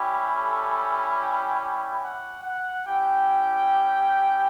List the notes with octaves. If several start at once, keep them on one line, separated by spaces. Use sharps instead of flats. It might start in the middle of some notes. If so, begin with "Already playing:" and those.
Already playing: G3 C#4 E4 G4
A4
G5
G5
F#5
F#5
C#4 E4 G4 G5